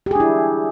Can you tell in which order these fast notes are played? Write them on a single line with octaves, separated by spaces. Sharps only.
G4 G#4 D4 E4